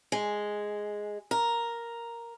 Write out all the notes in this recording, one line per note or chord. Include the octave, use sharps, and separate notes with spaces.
G#3
A#4